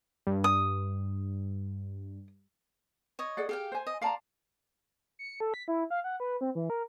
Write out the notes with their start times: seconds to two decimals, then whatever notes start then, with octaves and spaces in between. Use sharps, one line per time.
0.27 G2
0.44 D#6
3.19 C#5 D#5
3.37 G#4 D5 F#5
3.49 G4 G#4 F5 G5
3.72 C5 G#5
3.87 D#5
4.01 D5 F5 A5 A#5 C6
5.19 C#7
5.40 A4
5.54 B6
5.68 E4
5.90 F5
6.04 F#5
6.20 B4
6.41 C4
6.55 E3
6.70 A#4